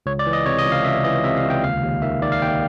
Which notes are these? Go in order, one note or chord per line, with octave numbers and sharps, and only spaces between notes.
C#2 C#5
D5
E3
D#5
C3 C#5
D#5
C#2
F5
C#2 E5
E3 D#5
C3 E5
F5
C#2
G5
D#2 F5
D#2
D#3 E5
D#3 D5
F5
D#2 G5